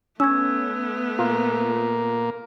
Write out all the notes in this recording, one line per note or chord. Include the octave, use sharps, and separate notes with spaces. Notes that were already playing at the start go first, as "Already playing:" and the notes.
A3 B3 C#4 E6 G#6
A#2 A#3 F4